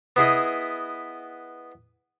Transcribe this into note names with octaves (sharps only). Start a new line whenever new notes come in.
B3 E4 G#4 D#5